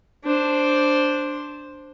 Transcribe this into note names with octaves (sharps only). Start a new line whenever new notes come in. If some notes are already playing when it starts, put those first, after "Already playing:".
D4 C5